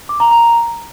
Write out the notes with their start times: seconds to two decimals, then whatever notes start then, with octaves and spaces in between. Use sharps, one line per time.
0.09 D6
0.20 A#5
0.31 A#5